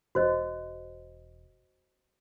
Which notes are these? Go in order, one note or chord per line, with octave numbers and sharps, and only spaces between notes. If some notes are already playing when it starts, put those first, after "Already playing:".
E1 F#4 C5 D#5